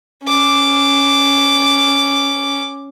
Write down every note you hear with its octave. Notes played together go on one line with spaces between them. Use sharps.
C#4 D6